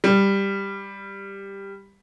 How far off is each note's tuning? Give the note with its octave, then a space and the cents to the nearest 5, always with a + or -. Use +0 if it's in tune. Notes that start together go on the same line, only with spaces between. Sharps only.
G3 +10